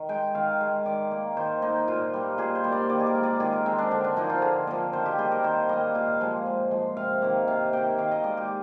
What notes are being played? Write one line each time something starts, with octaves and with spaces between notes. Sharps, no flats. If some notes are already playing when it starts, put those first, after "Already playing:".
Already playing: D#3
G#3 G5
D#3 F5
G#3
D#3 D5
A#3
D#3 C5
A#3 D#4
A#2 F4
G3 A#3
A#2 G#4
C5
G3 A#3
D5
D#3 D5
G#4
A#4
G#3
D5
D#3 G#4
A#4
G#3 C4
D4
D3
D4
F3 A#3 D#4
F4
D3 G#4
F3 A#3
D#3 C5
G4
G3 A#3 G#4
A#4
D#3 C5
G3 A#3 D#5
A#2 F5
F3 G#3
A#2
F3 G#3
C3 F5
D#3 A#3
C3 F5
D#3 A#3 G5
D#3 F5
D#5
G#3 D5
G4